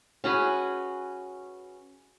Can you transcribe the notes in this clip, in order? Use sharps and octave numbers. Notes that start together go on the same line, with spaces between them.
C#4 F#4 G#4 B4